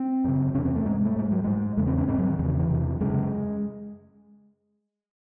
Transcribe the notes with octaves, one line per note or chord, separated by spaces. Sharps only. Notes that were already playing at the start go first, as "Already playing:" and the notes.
Already playing: C4
F#2 C#3
E2 C3 C#4
C4
A3
G#2 G#3
A3
G#2 G#3
F#3
G#2 G#3
E2 C#3 A3
C4
C#4
G#2 C4
F#3
D#3
E2 C#3 D#3
D#3
E3
E2 C3
F#2 C#3 G#3